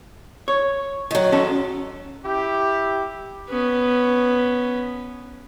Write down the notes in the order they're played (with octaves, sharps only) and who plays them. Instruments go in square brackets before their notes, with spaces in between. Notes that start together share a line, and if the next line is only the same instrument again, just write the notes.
[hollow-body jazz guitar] C#5
[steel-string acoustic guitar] D#3 F#3
[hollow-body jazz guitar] C#4 A4
[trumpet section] E4 G4
[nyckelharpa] B3 C#4